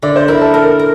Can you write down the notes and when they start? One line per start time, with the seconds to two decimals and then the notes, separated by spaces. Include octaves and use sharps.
0.02 D3 D5
0.16 C5
0.28 E4 A#4
0.42 A4
0.54 A4 A#4
0.79 A#4